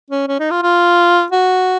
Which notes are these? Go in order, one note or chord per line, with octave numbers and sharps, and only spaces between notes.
C#4
C#4
D#4
F4
F4
F#4